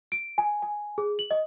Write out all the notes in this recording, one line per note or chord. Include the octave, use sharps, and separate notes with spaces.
D7
G#5
G#5
G#4
F#7
D#5